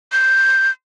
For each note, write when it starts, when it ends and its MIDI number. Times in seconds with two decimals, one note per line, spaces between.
0.12 0.71 91